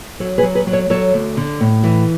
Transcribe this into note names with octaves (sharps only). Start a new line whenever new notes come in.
F#3 A4 C#5
G#4 B4
F#3
G#4 B4
F#3
A4 C#5
F#3 A4 C#5
D2
D3
A2
E3